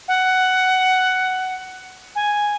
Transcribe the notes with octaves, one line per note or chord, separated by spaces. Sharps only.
F#5
G#5